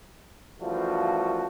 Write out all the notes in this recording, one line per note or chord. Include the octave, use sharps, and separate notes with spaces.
F#2 E3 F3 G3 A3 F#4